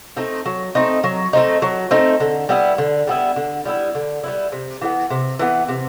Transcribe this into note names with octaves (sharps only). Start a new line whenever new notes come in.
A3 C4 D#4
F#3
A3 C4 D#4
F#3
A3 C4 D#4
F#3
A3 C4 D#4
D3
G3 B3 E4
D3
G3 B3 E4
D3
G3 B3 E4
D3
G3 B3 E4
C3
E3 G3 B3
C3
E3 G3 B3
C3